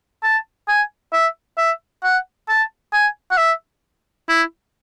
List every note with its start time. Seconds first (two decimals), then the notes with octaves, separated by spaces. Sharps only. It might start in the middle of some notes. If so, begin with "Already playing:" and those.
0.23 A5
0.68 G#5
1.13 E5
1.58 E5
2.04 F#5
2.49 A5
2.93 G#5
3.31 F#5
3.38 E5
4.29 E4